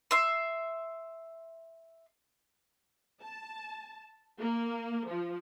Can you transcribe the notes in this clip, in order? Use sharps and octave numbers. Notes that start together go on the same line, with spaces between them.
E5 C6
A5
A#3
F3